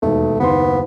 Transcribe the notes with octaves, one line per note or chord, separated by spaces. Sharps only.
E1 D#2 A3
F#1 D#2 B3 C6